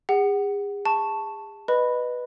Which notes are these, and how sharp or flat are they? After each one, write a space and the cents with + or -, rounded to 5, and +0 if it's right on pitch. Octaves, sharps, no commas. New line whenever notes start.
G#4 -40 F#5 +20
A5 +0 C#6 -5
B4 +0 D#5 -20 B5 +0